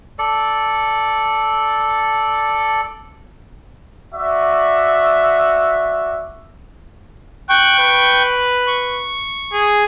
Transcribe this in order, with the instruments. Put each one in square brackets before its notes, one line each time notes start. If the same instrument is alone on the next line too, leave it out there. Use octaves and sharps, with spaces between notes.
[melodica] A4 D5
[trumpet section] F#4 D5 E5
[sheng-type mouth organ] G5 C#6 [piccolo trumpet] F#6
[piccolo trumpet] B4
[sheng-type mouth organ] C#6
[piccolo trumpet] G#4